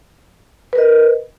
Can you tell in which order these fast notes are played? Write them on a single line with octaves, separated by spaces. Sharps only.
B4 A#4 D#5